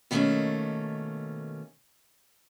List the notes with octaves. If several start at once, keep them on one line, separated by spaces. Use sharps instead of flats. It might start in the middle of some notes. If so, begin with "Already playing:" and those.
B2 D#3 G3 A3 A#3 C#4